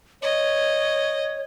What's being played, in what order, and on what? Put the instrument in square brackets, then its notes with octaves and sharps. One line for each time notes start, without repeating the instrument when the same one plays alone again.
[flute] C#5 [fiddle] D#5